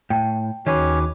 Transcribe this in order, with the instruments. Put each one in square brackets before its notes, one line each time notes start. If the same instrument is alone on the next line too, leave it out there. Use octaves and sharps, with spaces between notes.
[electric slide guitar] A2 [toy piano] G5 A5
[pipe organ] D#2 F#4 D6 [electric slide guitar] D#3 G#4 B4 [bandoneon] C#4 C#5